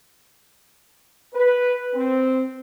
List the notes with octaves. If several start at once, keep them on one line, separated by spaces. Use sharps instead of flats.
B4
C4